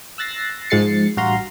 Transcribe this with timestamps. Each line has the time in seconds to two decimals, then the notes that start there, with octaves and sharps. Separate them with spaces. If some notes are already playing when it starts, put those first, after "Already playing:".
0.18 E6 F#6 A6 A#6 C7
0.70 G#2 F3 G#3 A6 C7 C#7
1.17 A1 G2 F#4 F5 A#5 C6